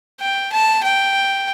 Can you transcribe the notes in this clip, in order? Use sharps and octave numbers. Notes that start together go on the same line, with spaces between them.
G5
A5
G5